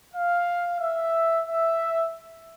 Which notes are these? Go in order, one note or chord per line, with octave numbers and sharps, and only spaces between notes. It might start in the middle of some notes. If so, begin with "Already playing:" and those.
F5
E5
E5